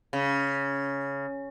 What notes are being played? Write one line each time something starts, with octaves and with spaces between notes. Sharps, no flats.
C#3